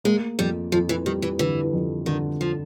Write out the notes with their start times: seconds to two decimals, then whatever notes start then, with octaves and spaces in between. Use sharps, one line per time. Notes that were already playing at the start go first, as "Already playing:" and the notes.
0.04 G#3 A#3
0.39 F2 G3
0.72 F2 F3
0.89 E3
1.06 D#3 G3
1.22 E3
1.39 D3 E3
1.73 F2
2.06 D3 D#3
2.41 F3